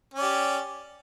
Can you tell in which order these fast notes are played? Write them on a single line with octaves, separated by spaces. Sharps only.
C#4 D5 G4